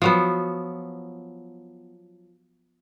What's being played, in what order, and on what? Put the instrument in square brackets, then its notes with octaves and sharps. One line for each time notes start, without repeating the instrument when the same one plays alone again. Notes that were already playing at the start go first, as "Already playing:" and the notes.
[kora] F3 F#3 B3